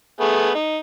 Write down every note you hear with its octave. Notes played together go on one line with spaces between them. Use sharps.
A3 B3 G#4
D#4